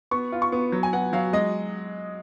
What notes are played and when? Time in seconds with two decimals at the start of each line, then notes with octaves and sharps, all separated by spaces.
0.11 B3 C#6
0.32 F4
0.42 C#6
0.52 B3
0.72 F#3
0.83 G#5
0.93 B3 F#5
1.13 F#3 F5
1.33 G#3 D#5